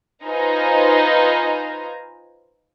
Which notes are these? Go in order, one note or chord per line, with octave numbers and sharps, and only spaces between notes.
D#4 F4 B4 C5 G#5 A#5